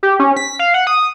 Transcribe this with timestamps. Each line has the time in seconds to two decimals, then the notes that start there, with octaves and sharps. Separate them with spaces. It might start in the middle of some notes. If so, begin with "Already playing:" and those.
0.03 G4
0.19 C#4
0.37 B6
0.59 F5
0.74 F#5
0.87 D#6